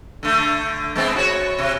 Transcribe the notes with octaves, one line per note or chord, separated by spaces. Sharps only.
D3 A3
G#3 B3 C4
F#4 C#5
C3